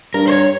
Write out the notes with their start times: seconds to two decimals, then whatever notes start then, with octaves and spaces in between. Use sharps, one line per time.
0.14 G2 A#4
0.28 C5
0.32 C#5